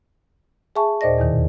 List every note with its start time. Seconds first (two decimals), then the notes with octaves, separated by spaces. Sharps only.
0.76 G#4 E5 G#5 A5 C#6
1.01 D#2 A#2 C5 D5 D#5 A#6
1.18 E2 B2 D#3